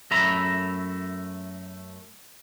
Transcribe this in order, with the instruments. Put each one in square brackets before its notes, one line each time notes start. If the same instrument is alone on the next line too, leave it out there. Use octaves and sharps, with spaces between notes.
[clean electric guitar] F#2 A3 E5 A#5 B5